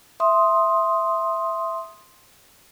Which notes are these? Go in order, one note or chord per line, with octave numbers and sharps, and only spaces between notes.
E5 C6 D#6